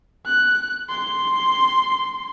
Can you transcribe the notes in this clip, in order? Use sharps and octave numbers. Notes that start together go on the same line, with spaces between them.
F#6
C6